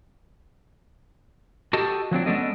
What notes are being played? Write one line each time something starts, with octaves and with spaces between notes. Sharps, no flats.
F#4 G4 A4 D#5 A5
F3 F#3 C4 D4
G#3 B3 C#4 D4 A4 D#5